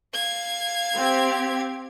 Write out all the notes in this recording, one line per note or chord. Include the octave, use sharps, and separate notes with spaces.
F5 G#6
C4 G4